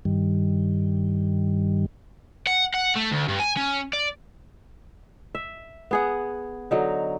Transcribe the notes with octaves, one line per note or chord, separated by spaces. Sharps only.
G2 D#3 G3
F#5
F#5
A3
D2
G2
G#5
C#4
D5
E5
B3 G#4 F#5
D3 F#3 D#4